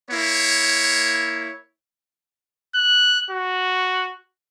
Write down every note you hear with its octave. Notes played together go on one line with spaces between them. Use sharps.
A#3 E4 C#5
F#6
F#4